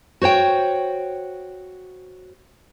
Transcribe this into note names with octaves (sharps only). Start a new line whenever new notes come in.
F#4 C5 C#5 G5